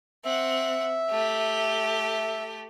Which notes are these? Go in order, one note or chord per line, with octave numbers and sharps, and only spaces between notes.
C4 E5 F#5
A3 G4